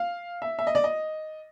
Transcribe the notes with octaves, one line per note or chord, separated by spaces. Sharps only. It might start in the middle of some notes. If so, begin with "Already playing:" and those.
Already playing: F5
E5
E5
D#5
D5
D#5